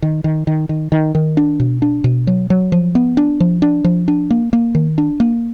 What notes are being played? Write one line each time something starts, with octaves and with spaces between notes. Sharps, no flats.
D#3
D#3
D#3
D#3
D#3
D#3
D4
B2
D4
B2
F#3
F#3
F3
B3
D4
F3
D4
F3
D4
A#3
A#3
D#3
D4
A#3